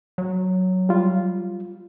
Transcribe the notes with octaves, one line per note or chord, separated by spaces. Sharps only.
F#3
G3 F4